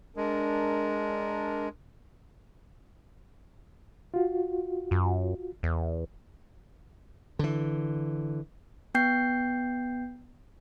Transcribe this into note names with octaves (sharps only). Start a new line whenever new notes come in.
G#3 D4 A#4
F4 F#4
F#2
E2
D3 E3
B3 G5 G6 C7